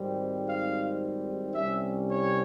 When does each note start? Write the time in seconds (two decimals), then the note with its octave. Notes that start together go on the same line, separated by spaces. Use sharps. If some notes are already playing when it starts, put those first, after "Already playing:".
Already playing: G#1 G#2 G3 C4
0.47 F5
1.55 C2 C3 G3 C#4 E5
2.09 C#5